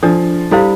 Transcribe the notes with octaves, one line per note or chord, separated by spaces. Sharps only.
F3 D4 A4 D5
G3 E4 A4 C5 F5